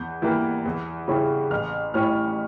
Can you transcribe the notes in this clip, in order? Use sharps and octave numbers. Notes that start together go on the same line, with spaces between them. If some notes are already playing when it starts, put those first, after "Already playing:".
Already playing: E2 G6
E3 G3 A#3
E2
C#3 G3 C#4 E4
A1 F6
A2 G3 C#4 E4 F6